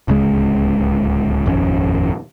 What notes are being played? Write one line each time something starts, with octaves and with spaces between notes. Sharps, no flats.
D1 C#2 C#3 G#3
D#1 G#1 F2 C#4